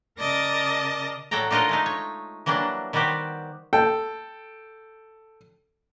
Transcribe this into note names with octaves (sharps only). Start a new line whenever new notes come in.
C#3 A#4 D5 D#5 A5 A#6
A2 F#3 A4 D5 G5 A#5
D4 D#4 F4 A4 A#4 D#5
G#3 A3 D#4
C#5
E3 F#3 G3 A#3 D4
D#3 G3 B3 F#4 G4 C5
A4 G5